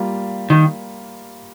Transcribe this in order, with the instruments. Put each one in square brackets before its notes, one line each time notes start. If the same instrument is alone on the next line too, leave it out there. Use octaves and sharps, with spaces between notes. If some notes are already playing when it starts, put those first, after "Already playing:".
Already playing: [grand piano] G3 A#3 F4
[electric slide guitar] D#3